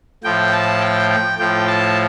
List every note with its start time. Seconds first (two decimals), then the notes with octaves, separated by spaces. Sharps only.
0.24 A2 F3 G5
0.52 A5
0.81 G5
1.10 G5
1.38 A2 F3 G5
1.67 A5